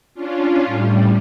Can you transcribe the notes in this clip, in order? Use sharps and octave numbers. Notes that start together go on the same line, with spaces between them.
C#4 D4 F4
A2 G3